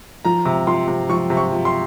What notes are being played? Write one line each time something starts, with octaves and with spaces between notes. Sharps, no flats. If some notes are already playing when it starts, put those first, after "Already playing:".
F3 A#5
C3
F3 C6
C3
F3 C#6
C3
C#6
F3
C6